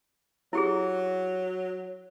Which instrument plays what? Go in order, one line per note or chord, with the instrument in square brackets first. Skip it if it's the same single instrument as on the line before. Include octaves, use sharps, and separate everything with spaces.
[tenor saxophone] F#3 [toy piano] E4 G4 G#4